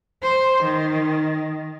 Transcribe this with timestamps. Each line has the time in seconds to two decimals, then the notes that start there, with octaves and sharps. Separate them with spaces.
0.22 C5
0.64 D#3